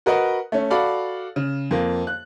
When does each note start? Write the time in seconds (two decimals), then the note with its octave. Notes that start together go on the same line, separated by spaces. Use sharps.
0.06 F#4 A#4 B4 D#5 F#5
0.52 A3 C#4
0.70 F#4 A4 D5 F5 B5
1.36 C#3
1.71 F2 A#3
2.07 F#6